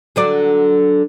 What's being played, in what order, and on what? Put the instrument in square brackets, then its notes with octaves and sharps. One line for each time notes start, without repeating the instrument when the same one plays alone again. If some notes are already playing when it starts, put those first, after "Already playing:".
[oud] D3 F#3 D5